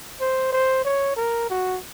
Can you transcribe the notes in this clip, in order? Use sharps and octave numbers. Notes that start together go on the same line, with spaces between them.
C5
C5
C#5
A#4
F#4